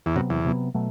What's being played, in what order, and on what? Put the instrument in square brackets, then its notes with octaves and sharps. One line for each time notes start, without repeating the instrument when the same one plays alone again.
[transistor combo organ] E2
[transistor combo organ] F#2 [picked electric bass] C3 F#3 B3
[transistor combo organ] E2
[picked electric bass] C3 F#3 B3
B2 F#3 A3